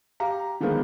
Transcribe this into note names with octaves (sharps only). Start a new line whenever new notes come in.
G4 F5 A#5
D3 D#3 F3 G#3 A#3 B3